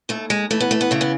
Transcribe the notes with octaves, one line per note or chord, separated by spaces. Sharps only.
D#2 A3
G#3
E3 A3
B3
A3
B3
C#3 A3
B3